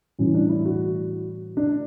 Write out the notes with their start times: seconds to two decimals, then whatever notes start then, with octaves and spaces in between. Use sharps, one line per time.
0.19 A2 E3 G3 C#4
0.34 D4
0.49 E4
0.65 F#4
1.57 D4